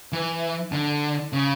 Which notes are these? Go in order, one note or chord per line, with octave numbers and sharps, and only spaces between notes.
E3
D3
C#3